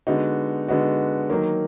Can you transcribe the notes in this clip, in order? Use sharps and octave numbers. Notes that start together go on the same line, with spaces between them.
D3 G#3 B3 D#4 F#4
D3 G#3 B3 D#4 F#4
D#3 F#3 A#3